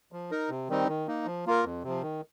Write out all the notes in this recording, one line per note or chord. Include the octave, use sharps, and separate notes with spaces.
F3
D#4 A#4
C3
D#3 G3 C4 D#4
D#3
A#3 D#4
F3
A#3 F4 A#4
F2
C3 F3
D#3